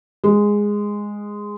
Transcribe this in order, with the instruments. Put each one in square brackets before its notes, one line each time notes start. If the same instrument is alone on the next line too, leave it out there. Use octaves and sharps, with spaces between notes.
[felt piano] G#3